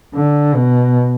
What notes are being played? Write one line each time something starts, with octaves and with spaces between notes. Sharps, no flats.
D3
B2